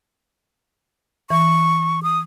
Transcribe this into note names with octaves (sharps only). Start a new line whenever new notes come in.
E3 C#6
D#6